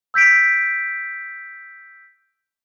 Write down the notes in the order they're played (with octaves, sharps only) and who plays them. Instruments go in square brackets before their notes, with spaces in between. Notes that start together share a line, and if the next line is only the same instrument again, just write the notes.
[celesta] E6 G6 B6 D7